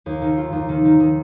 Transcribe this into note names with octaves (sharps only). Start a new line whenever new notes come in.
D#2
D#3
F4
D#2
D#3
D#3
D#3